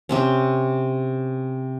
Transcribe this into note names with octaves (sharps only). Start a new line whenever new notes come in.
C3 C4 C#4